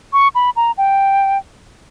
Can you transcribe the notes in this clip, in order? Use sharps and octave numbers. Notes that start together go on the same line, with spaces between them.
C#6
B5
A#5
G5